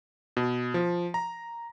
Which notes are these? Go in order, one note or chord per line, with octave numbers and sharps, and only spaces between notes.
B2
F3
A#5